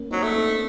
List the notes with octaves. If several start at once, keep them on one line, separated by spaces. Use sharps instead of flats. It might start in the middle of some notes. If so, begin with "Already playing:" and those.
Already playing: A#3 C#4
F#3 C4 D#4
A3
C4 D#4